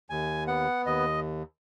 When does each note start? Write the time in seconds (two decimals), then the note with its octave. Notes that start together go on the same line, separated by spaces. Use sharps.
0.10 D#2 G#5
0.47 B3 F#5
0.86 D#2 D#5